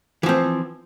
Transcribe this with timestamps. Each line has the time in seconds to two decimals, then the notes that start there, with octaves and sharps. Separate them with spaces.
0.23 E3
0.26 F3
0.29 C4